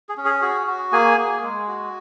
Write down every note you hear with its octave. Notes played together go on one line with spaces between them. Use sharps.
G#4
C#4
G#4
F#4 G#4
F#4
A#3 G#4 G#5
A#3
G#3
F#4